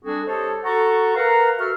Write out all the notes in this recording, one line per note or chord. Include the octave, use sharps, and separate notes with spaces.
G3 C4 D4 F#4 G#4 A4
G4 A4 C5 C#5 D#5 A5
F#4 A4 F#5 A#5 C#6
A#4 B4 F5 F#5 A#5
F#4 A4 E5 C#6 E6 F6